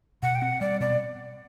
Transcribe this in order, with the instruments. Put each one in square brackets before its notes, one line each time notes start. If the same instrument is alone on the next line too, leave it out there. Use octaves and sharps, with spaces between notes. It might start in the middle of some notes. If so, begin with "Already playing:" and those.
[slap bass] B2 [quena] F#5
[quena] G5
[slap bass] C4 [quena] F#5
[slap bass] G3 [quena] D5
[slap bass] B2 [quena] D5